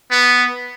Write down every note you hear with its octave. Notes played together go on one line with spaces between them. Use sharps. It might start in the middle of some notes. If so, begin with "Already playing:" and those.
B3